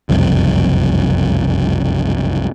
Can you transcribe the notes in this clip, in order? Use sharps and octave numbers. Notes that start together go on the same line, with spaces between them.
F#1 C2 F2